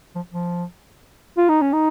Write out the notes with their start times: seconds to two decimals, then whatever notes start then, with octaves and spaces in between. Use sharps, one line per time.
0.15 F3
0.33 F3
1.37 F4
1.49 D#4
1.61 C#4
1.73 D#4